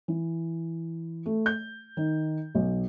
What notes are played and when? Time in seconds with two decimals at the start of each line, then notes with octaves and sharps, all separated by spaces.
0.08 E3
1.26 A3
1.46 G6
1.97 D#3
2.55 B1